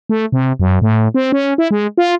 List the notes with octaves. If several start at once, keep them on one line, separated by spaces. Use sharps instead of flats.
A3
C3
F#2
A2
C4
C#4
E4
G#3
F4